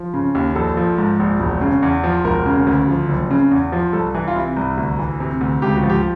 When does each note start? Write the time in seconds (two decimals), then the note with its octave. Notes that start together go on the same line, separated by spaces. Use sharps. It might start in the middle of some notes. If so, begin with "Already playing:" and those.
Already playing: F3
0.14 C#3
0.35 D#2
0.56 A#1 A4
0.77 F3
0.98 G#2
1.19 A#1
1.40 E1
1.61 C#3
1.82 E2
2.04 F3
2.25 E1 A#4
2.46 C#3
2.67 D2
2.88 F3
3.09 F#1
3.30 C#3
3.51 E2
3.72 F3
3.93 C2 A4
4.15 E3
4.28 F4
4.36 C3 E4
4.57 C2
4.78 D2
4.99 E3
5.20 C3
5.41 D2
5.62 C#2 G4
5.76 F#4
5.83 F3
5.90 G4